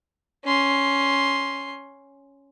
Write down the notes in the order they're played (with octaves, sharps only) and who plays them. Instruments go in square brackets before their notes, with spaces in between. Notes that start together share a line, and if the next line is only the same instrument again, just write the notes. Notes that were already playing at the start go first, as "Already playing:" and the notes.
[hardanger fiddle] C#4 C6